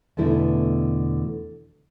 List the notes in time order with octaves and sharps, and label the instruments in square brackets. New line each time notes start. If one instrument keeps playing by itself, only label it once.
[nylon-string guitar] E2 B2 D3 A3 E4